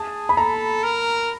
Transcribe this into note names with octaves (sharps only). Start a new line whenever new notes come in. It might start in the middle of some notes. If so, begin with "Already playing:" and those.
Already playing: G#4 A5
B5
A4 A#5
A#4